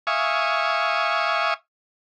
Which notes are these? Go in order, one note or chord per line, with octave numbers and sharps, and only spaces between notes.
E5 F5 G#5 C#6 D#6